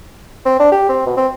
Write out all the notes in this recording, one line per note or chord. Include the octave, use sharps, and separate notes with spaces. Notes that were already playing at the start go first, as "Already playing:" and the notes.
C4
D4
G4
C4
B2
C4